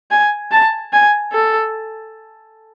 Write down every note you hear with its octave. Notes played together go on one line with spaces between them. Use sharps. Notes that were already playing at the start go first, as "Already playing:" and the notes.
G#5
A5
G#5
A4